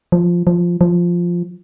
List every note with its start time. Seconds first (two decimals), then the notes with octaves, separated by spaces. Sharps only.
0.12 F3
0.47 F3
0.81 F3